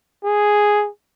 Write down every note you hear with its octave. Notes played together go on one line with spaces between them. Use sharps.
G#4